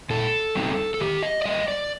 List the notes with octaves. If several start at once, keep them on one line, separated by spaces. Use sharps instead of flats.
A#2 A4
G3 C4 D#4
A4
D#3 G4
D#5
D5
G3 A#3 D#5
D5